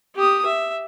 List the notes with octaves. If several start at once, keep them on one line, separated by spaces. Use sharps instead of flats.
G4 D#6
E5